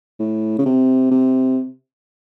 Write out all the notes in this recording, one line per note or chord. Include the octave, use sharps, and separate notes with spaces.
A2
C#3
C3
C3